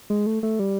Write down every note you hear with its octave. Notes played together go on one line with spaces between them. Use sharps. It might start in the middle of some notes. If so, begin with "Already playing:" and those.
G#3
A3
A3
G3